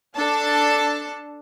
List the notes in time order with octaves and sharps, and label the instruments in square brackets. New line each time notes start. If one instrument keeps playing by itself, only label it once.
[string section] D4 A4 A5